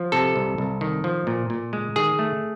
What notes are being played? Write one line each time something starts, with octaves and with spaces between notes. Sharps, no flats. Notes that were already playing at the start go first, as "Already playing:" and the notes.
Already playing: F3
C3 A4
C2
C2
D#3
F3
A#2
A#2
G#3
D#3 G#4
A3